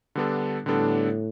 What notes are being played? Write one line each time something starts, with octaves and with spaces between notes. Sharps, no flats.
D3 G3 B3 D4 A4
A2 D3 G3 B3 D4 A4